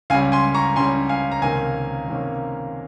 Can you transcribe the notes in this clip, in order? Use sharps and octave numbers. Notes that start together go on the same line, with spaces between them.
C#2 C#3 G3 C#4 F5 G#5
G#5 C6
A#5 C#6
C#2 C#3 G3 C#4 G#5 C6
F5 G#5
A#5
C#2 C3 D#3 A#3 C#4 F5 G#5
C#2 C3 D#3 A#3 C#4